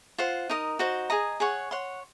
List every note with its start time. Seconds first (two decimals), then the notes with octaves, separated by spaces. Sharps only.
0.18 F4 C5 F#5
0.50 D#4 A#4 D#5
0.79 D#4 F#4 C5
1.10 G#4 D#5 A#5
1.40 G#4 C#5 F#5 C#6
1.71 C#5 F#5 C6